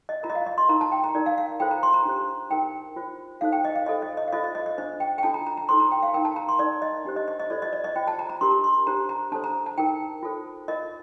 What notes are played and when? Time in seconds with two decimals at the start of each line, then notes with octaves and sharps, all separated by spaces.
0.09 D#5
0.23 F4 A#4 A#5
0.30 D#5
0.35 F5
0.46 D#5
0.58 C6
0.69 D#4 A#4 A#5
0.81 A5
0.92 G5
1.04 A#5
1.15 D#4 A#4 D5
1.26 F5
1.38 F5
1.60 F4 A4 C5 G5
1.71 A#5
1.83 C6
1.94 A#5
2.06 D4 G4 C5
2.50 D#4 A#4 G5
2.96 F4 C5
3.41 D#4 A4 C5 F5
3.52 G5
3.65 D#5
3.76 F5
3.86 F4 A4 C5 D#5
4.02 D#5
4.17 D#5
4.28 F5
4.33 F4 A4 C5 D#5
4.44 D#5
4.55 D#5
4.66 D#5
4.78 D4 A4 C5 D#5
5.00 G5
5.18 G5
5.23 D4 F4 A4 A5
5.34 A#5
5.46 A#5
5.57 A#5
5.69 D#4 A4 C5 C6
5.80 A#5
5.92 G5
6.03 F5
6.14 D#4 A#4 G5
6.25 A5
6.36 A#5
6.49 C6
6.59 D#4 A#4 D5
6.82 D#5
7.05 D4 G4 C5
7.16 D#5
7.28 D#5
7.40 D#5
7.50 F4 A4 C5 D5
7.62 D#5
7.73 D5
7.84 D#5
7.96 F4 C5 G5
8.08 A5
8.19 A#5
8.29 A#5
8.41 D4 G4 A#4 C6
8.64 C6
8.87 D4 G4 C5 A#5
9.09 A#5
9.32 D4 A4 C5 A5
9.44 A#5
9.66 A5
9.78 D#4 A#4 G5
10.23 F4 A4 C5
10.68 F4 A#4 D#5